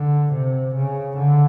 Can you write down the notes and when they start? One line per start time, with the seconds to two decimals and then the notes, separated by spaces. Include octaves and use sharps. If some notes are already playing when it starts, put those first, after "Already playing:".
Already playing: D3
0.33 C3
0.75 C#3
1.17 D3